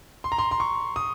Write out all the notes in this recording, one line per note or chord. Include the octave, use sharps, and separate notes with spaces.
C6
A#5
C6
C6
C#6
D#6